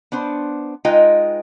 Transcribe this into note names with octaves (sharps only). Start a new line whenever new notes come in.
B3 D4 C5
G#3 D#4 F4 B4 D#5 G5